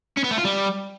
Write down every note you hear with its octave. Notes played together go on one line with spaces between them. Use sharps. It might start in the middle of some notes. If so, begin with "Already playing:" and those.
C#4
B3
A3
F4
G3